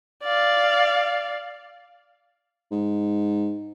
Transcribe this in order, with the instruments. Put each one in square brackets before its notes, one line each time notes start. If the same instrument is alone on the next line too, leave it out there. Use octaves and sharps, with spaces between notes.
[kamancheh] D5 F5
[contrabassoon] G#2